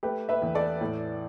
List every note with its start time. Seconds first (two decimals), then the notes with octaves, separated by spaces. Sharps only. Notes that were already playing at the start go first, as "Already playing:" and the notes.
0.03 A3 G4 B4
0.29 B4 E5
0.42 E2
0.55 A4 D5
0.81 A2